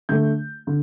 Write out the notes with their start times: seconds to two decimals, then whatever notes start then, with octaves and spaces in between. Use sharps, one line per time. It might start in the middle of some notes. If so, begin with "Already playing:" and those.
0.09 D3 A3 G6
0.67 D3